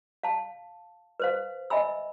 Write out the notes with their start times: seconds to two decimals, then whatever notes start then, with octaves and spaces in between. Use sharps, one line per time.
0.23 F5 A5
1.20 B4 C5 F5
1.70 D#5 E5 G#5 B5 E6